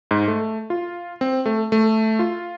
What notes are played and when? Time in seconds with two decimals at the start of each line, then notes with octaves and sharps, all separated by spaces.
0.11 G#2
0.28 A3
0.70 F4
1.21 C4
1.46 A3
1.72 A3
2.19 F4